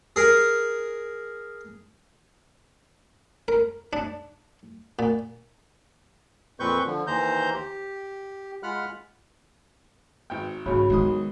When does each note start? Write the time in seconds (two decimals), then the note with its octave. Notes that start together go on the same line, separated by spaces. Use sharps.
0.16 G#4 A#4
3.48 A#4
3.93 D4
4.99 A#2
6.60 F2 A#2 C4 B4 C#6 G6
6.86 D3 F3
7.07 D#2 E3 C5 A#5 G6
7.54 G4
8.63 G#3 F4 F#5 B5 F6 F#6
10.30 G#1 G5
10.66 D#2 G#2 C#3 F#4 C#5 B5
10.90 B1 G#2 D#3 G#3 D#6